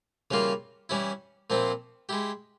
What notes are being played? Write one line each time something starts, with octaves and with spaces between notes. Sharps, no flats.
C#3 E3 G3 A#3 F4
E3 G3 C#4 E4
A#2 F3 C4 E4
G#3 E4 G4